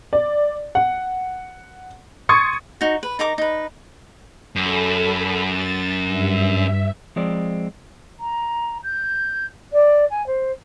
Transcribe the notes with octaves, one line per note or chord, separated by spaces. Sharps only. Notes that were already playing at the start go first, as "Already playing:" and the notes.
D5
F#5
C6 C#6 D#6 G#6 A6 C#7
D#4 F#4
B4
D#4 A#4 A#5 D6
D#4 B4
F#2 A4 B5
A6
G2 E5
F3 G#3 C4 D5
A#5
G6
D5
G#5
C5